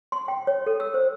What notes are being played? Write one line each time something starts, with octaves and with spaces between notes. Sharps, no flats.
C6
G5
C#5
A4
E6
C5